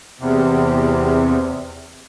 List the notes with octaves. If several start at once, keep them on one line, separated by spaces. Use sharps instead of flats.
E2 C3